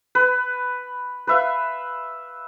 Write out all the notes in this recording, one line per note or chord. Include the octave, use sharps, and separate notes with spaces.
B4
B4 E5 F5